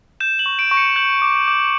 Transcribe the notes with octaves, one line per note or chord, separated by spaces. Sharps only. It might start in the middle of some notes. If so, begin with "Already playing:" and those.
G6 E7
F#7
C#6
D7
C#6
C#7
G6 F#7
D6
D6